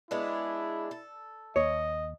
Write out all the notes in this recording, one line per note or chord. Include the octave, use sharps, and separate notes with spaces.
G#3 B3 D4 E4
A4
D#2 C#5 D#5